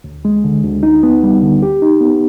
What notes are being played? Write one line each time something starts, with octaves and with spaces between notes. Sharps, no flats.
D2
G#3
D3
D2
D#4
B3
G3
D3
G4
D#4
B3